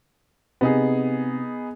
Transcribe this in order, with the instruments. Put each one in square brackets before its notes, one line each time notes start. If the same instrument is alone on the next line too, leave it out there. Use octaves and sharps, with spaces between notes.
[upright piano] C3 [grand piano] B3 D#4 G#4